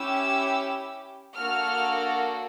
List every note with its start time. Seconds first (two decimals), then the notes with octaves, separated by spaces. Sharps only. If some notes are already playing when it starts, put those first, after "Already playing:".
Already playing: C#4 E4 G4 E6
1.36 A#3 D4 F#4 A4 F6